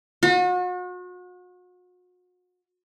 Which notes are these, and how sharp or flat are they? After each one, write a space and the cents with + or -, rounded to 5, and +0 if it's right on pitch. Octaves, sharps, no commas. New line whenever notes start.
F#4 -40